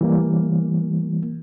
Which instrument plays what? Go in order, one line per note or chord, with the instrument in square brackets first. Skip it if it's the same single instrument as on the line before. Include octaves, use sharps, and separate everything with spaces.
[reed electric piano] E3 G3 A#3